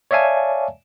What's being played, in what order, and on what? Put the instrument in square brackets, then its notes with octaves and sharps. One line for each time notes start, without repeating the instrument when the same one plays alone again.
[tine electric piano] C#5 D5 E5 F5 G#5 A5